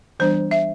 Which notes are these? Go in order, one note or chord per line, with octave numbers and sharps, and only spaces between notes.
E3 G3 B3 D4 C5
E5